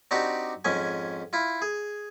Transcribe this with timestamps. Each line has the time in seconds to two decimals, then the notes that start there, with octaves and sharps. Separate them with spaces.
0.11 C4 D4 D#4 F#4 G4 D5
0.65 F2 G#2 C#4 G#5
1.33 E4 F4
1.62 G#4